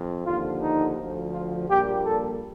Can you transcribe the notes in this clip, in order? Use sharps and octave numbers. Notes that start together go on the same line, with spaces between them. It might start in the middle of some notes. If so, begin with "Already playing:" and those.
Already playing: F2
D#2 D3 F3 F4
D#4
D2 D3 F3
F4
A#1 A#2 G3 G4
A4